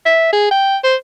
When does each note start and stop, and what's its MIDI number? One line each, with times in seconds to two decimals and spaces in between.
0.06 0.31 76
0.33 0.50 68
0.51 0.77 79
0.84 0.95 72